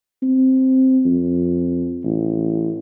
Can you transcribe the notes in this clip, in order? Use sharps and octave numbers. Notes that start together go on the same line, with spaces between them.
C4
F2
A1